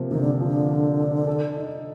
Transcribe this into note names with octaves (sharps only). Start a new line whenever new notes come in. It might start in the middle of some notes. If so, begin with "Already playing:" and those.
Already playing: C3 F3 A#3
C3 D#3
D3
D3 F3
D4
D4
A4
D#4